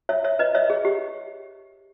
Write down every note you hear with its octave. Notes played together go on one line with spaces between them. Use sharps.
C#5 E5
C#5 E5
B4 D#5
C#5 E5
G#4
G4